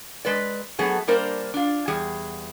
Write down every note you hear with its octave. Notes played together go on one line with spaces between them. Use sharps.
G#3 B4 D5
F#3 A3 B3 G#4
G3 A#3 D4 A#4 C5 D5
D4 F4
E2 G3 G#4